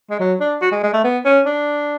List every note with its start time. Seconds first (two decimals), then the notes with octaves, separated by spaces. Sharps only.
0.10 G#3
0.19 F#3
0.40 D4
0.61 F#4
0.72 G#3
0.83 G#3
0.93 A3
1.04 B3
1.25 C#4
1.46 D4